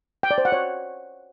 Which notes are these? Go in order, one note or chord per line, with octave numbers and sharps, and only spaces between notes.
G5
D5
C5
F#5
C#5